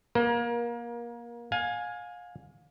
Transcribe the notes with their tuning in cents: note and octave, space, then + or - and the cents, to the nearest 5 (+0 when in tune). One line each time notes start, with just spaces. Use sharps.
A#3 +25 A#4 +35
F5 +30 G#5 +0